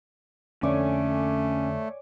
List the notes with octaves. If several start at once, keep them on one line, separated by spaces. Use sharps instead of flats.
F2 D3 A3 C#4 C#5 D5 G#5